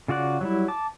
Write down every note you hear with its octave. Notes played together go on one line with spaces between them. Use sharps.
C#3 F4 F#4 D5 F#6
F#3 G3 E4
A5 D6